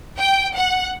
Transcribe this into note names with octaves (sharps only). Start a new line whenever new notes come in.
G5
F#5